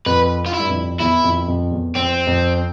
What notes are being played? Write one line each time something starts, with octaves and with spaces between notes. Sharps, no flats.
F2 B4
F4
E4
G2
F2
E2 E4
F2
F2
E2
F2 C4
F2